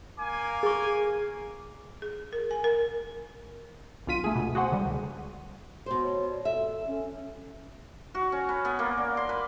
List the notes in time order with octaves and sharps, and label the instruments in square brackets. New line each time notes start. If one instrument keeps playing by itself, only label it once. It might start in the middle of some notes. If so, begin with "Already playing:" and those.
[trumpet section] A#3 G#5 D6
[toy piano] G#4 C#6
[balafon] G#4
A#4
G#5
A#4
[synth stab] B1 D3 F4 B6 D#7
A3 G#4
D2 B2
F#4 G#4 C5 F#5
D3 G3
C#2
[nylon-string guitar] B2 C5
[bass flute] C#5
D5
[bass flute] A4 [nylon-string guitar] E5
[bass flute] C#4
[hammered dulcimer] F#4
C#4
B4
B3
A#3
D5
C6
B4